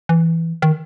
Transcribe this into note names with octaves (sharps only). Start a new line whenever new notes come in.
E3
D#3